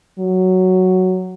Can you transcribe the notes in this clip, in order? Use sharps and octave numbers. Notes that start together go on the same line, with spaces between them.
F#3